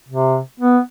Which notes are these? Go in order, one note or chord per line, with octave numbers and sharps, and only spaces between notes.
C3
B3